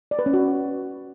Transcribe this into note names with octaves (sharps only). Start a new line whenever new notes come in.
D5
B4
C#4
F#4